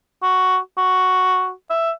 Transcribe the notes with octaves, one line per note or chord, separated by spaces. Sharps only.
F#4
F#4
E5